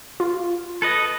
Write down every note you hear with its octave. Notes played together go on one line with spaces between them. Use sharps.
F4
A4 B4 D#5